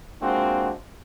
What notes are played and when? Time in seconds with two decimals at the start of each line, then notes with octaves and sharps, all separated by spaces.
0.22 G#3 A#3 C4 D4 F4 F#4